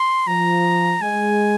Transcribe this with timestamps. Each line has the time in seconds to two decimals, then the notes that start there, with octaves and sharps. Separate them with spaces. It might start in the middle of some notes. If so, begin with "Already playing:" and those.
Already playing: C6
0.27 F3 A#5
1.01 G#3 G#5